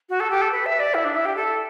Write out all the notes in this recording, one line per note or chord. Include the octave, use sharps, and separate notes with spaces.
F#4
A4
G4
A4
B4
E5
D5
E4
D4
E4
G4
A4